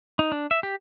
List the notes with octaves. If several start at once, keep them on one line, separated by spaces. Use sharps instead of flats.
D#4
D4
E5
G4